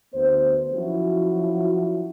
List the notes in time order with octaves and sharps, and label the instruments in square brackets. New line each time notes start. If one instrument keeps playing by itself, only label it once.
[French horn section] D2 B3 C5
F3 F#3 C#4 E4 F#4